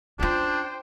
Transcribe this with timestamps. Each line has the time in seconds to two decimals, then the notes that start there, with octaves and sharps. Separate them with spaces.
0.19 C#4 D4 F4 C5 G5